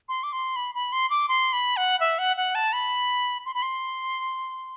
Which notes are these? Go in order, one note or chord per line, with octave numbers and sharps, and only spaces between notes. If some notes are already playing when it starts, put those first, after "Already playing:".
C6
D6
C6
B5
B5
C6
D6
C6
B5
F#5
E5
F#5
F#5
A5
B5
C6
B5
C6